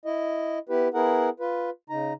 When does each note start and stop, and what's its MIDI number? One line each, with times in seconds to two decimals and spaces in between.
0.05 0.59 64
0.05 0.59 75
0.69 0.88 59
0.69 0.88 64
0.69 0.88 67
0.69 0.88 71
0.94 1.29 59
0.94 1.29 64
0.94 1.29 68
0.94 1.29 70
0.94 1.29 78
1.40 1.70 65
1.40 1.70 71
1.90 2.13 49
1.90 2.13 63
1.90 2.13 82